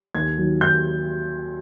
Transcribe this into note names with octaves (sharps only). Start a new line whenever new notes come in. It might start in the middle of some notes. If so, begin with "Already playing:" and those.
D#2 G#6
D#3 F#3
D#2 G6